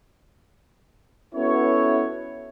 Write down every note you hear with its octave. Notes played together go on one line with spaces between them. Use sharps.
B3 C#4 E4 F#4 A4 C#5